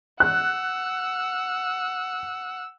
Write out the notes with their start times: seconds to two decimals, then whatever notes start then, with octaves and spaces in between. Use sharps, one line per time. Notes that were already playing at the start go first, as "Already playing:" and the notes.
0.20 F#5 E6 F#6